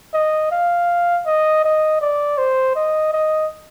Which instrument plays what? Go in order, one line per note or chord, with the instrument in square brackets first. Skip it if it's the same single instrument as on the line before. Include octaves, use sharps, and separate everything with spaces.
[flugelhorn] D#5
F5
D#5
D#5
D5
C5
D#5
D#5